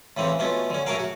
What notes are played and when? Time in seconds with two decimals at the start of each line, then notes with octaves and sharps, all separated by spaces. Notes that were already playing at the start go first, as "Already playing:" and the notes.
0.17 A2 C#3 E3 C4
0.39 B2 A3 B3 C#4 F4
0.70 D3 C#4
0.86 A3 C#4 F#4 G#4 A#4 F5
0.99 F#4